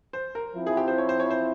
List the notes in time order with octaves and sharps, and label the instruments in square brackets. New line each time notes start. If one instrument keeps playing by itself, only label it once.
[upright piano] C5
A#4
[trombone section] F3 C4 E4
[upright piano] G#4
G4
C5
C#5
C5
C#5
C5